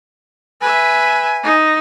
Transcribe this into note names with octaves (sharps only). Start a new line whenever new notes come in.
B4 E5 G#5
D#4